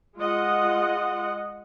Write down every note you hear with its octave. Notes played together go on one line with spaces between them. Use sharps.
G#3 F4 D#5 F#5